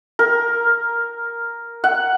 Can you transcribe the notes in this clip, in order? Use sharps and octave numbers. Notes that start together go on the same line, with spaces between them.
A#4
F#5